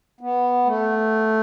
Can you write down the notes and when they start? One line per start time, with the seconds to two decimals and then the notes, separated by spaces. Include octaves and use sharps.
0.21 B3
0.65 A3